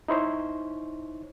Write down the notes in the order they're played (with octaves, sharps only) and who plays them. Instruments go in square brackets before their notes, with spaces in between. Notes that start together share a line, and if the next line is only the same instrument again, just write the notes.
[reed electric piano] D#4 E4 C5 C#5